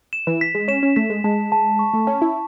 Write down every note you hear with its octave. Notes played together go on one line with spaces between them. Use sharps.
E7
E3
B6
G#3
C#4 E7
C#4
A3 B6
G#3
G#3 A5
A5
C#6
A3
C#4 A5
E4